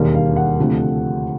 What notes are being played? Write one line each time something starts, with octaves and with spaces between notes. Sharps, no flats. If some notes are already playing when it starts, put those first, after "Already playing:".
Already playing: E1 D#2 D#3 G3 A#3
F5
F#5
D2 C3 F3 A3